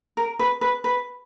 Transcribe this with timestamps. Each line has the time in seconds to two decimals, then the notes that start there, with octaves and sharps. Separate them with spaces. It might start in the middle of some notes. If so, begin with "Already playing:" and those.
0.17 A#4
0.39 B4
0.61 B4
0.84 B4